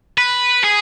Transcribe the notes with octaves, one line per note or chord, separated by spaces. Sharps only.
B4
G#4